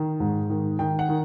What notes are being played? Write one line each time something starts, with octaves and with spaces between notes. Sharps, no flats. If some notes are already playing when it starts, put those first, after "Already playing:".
Already playing: D#3
G#2
D#3
D#3 G5
F#5
D#3